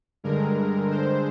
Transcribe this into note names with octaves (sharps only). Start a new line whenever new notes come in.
G2 D3 G#3 A#4
C5